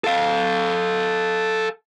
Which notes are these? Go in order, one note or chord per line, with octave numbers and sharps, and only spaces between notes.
A4 F5